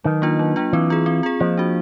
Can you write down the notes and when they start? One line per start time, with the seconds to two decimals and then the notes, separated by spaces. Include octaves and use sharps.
0.04 D#3 F#3
0.22 A#3 D4 F4
0.39 F#3
0.56 A#3 D4 F4
0.73 E3 C4
0.90 F4 G#4
1.06 C4
1.23 F4 G#4
1.40 F3 A#3
1.57 D4 F#4